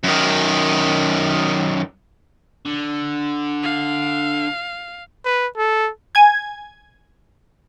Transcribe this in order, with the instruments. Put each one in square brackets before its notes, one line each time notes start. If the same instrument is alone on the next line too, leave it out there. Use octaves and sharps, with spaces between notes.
[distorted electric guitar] F#2 D#3
D3
[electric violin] F5
[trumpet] B4
A4
[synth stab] G#5 G#6